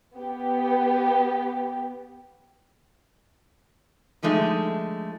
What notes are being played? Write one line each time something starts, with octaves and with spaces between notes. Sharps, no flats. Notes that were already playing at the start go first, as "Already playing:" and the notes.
B3 G4
D3 F3 G#3 A3 D#4